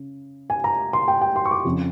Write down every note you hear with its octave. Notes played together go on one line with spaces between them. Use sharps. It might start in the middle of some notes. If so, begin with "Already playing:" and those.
Already playing: C#3
G#5
A#5
C6
G5
G5
C6
C#6
D6
F2 C#3 F3